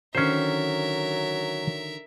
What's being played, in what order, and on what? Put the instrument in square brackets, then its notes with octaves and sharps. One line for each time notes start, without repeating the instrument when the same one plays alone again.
[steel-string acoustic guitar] D3 D#3 [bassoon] F#3 [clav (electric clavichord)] C#4 C5 [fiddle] A#4 E5